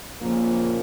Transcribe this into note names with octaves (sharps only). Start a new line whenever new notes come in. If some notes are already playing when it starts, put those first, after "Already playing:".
F2 A#2 C#3 F3 A#3